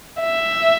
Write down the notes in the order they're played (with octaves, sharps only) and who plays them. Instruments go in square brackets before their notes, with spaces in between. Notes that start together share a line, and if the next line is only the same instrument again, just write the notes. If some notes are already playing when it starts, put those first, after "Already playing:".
[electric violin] E5